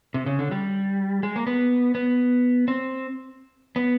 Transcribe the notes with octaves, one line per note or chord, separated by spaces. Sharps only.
C3
C#3
D3
G3
G#3
A#3
B3
B3
C4
B3